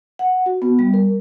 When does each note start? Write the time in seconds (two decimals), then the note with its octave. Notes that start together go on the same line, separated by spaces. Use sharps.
0.19 F#5
0.46 F#4
0.62 B3
0.79 G3
0.94 A#4